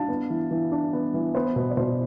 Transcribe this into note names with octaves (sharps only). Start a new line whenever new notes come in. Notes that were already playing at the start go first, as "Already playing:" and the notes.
Already playing: D4 F5 A5
B3
E3
E3
D4
B3
E3
B3 C5
B2 B4
D5
B2 C5